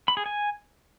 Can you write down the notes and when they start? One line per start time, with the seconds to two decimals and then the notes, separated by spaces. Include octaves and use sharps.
0.08 B5
0.17 G#4
0.26 G#5